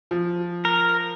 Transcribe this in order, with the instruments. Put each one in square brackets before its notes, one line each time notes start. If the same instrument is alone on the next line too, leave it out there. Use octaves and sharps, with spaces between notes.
[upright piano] F3
[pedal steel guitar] A#4